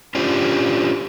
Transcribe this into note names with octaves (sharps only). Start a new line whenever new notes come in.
C#4 D4 F4 G4 C5